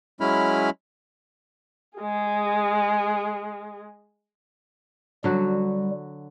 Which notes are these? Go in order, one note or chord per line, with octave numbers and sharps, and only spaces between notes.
F#3 G#3 C#4 E4 B5 F6
G#3 G#4
D3 F#3 G3 F#4